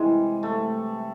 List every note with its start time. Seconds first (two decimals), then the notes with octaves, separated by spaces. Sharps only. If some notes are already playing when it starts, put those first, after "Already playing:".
Already playing: C3 E3 G3 G#3
0.43 A3